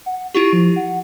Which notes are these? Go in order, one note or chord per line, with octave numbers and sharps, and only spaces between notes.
F#5
E4 F4 G4 C#6
F3
F#5